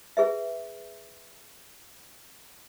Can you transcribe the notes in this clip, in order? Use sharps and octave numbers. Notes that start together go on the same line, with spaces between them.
G#4 B4 E5